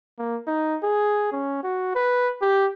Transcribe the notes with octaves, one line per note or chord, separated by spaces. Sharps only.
A#3
D#4
G#4
C#4
F#4
B4
G4